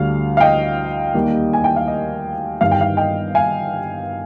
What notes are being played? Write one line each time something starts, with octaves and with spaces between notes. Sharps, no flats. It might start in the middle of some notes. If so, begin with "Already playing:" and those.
Already playing: D2 D3 G3 F5
F5
D#5 G5
D#2 D#3 G3 A#3
G#5
G5
F5
D#5
G1 G2 D#3 G3 F5
G5
F5
D#5 G5
F5 G#5